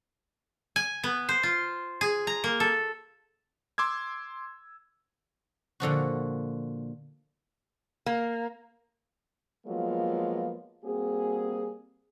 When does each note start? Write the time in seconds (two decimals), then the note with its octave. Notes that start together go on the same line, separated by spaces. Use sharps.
0.76 G#5
1.03 B3
1.29 C5
1.43 F4
2.01 G#4
2.27 A#5
2.44 A#3
2.60 A4
3.78 C6 D6 E6 G#6
5.80 A#2 D3 F3 F#4
8.06 A#3
9.67 F3 F#3 G#3 A#3 B3 F4
10.85 G3 A#3 C4 F#4 G#4